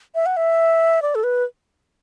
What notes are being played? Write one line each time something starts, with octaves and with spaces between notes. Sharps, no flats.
E5
F#5
E5
D5
A4
B4